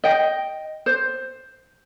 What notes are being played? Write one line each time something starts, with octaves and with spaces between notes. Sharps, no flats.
D#5 G5
C5